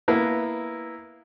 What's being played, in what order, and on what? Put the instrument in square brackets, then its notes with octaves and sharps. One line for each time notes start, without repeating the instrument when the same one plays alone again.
[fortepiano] A#3 B3 E4